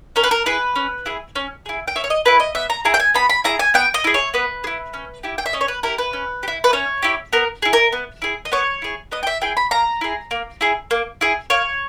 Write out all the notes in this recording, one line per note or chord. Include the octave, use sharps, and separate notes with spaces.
C#4 A#4
B4
A#4
E4 G#4 B4
C#4
E4 G#4
C#4
E4 G#4
G5
C#4 E5
C#5
D#5
E4 G#4 B4
D#5
B3 E5
A#5
E4 G#4 A#5
G5
G#5
B3 B5
B5
E4 G#4 A#5
G#5
B3 G5
D#5
E4 G#4
C#5
B3 B4
G#4
E4
C#4
E4 G4
G5
E5
C#4 D#5
C#5
B4
E4 G4 A#4
B4
C#4
G4
E4
B4
C#4 C#5
E4 G4
B3 A#4
E4 G#4
A#4
B3
E4 G#4
D#5
B3 C#5
E4 G#4
B3 D#5
G5
E5
E4 G#4 G5
B5
A#3 A#5
E4 G#4
A#3
E4 G#4
A#3
E4 G#4
A#3 C#5